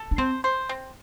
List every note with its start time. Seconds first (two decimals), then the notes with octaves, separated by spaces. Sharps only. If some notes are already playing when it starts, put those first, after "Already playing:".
Already playing: A4
0.11 D4
0.18 C4 C5
0.44 C5
0.69 C4